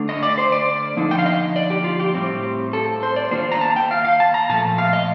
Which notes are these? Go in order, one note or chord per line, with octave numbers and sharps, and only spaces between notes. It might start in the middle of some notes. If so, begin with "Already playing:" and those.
Already playing: D3 A3 D4
D#5
D5
C5
D5
D3 F3 A#3 D#4
G5
F5
D#5
D5
G4
F4
G4
A2 G3 C4
A4
C5
D5
D#3 A#3 D4 F4 C5
A#5
A5
G5
F5
F5
A5
A#5
A#2 F3 A3 A5
F5
D#5